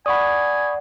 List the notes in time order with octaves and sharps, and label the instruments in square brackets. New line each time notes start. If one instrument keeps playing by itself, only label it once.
[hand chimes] D5 F#5 [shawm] G#5 [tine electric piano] B5 C#6 D#6